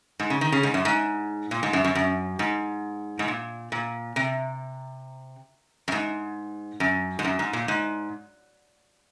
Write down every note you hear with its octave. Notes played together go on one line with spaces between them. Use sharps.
G#2
C#3
D#3
C#3
G#2
F#2
G#2
A#2
G#2
F#2
F#2
F#2
G#2
G#2
A#2
A#2
C3
F#2
G#2
F#2
G#2
F#2
G#2
A#2
G#2